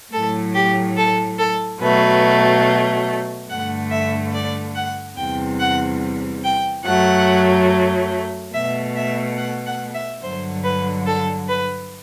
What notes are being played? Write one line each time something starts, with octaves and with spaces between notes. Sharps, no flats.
A2 F#3 A3 A4
G4
A4
A4
B2 F#3 A3 B4
G2 D3 A3 F#5
E5
D5
F#5
E2 C3 G3 G5
F#5
G5
F#2 F#3 A3 F#5
B2 A3 E5
E5
F#5
F#5
E5
G2 D3 F#3 C5
B4
A4
B4